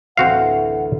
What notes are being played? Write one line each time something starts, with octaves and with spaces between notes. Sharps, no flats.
A1 D2 C4 F#4 F5 F#5